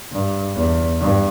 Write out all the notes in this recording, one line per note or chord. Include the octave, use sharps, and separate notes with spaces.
G2
E2
G2